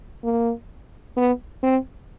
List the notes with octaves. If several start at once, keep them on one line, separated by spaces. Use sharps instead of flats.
A#3
B3
C4